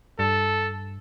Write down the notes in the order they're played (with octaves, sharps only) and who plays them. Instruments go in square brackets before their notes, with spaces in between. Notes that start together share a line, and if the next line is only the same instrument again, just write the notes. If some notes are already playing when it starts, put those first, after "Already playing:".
[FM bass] G2 [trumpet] A4